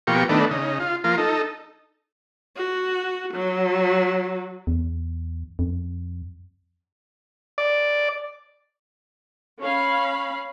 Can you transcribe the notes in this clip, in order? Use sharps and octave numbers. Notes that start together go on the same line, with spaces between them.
B2 F3 A#3 G4 C#6
D#3 A3 B3 D4
C#3 D#4
F4
F3 A#3 F4
D#4 A4
F#4
F#3
E2
F2
D5
C#4 F5 B5